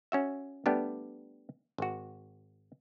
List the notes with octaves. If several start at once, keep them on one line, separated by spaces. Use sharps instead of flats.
C#4 F#4 E5
G3 A3 B3 D4 G4
G#1 F#4